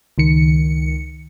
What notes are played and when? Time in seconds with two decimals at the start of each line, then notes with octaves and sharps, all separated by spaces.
0.18 C#2 D#3 C#7